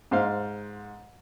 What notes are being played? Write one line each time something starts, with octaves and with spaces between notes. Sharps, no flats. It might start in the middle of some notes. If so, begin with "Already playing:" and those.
G#2 C5 F5